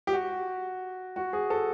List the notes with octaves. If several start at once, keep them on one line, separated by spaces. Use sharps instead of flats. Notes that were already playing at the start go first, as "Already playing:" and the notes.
G4
F#4
F#4
G#4
A4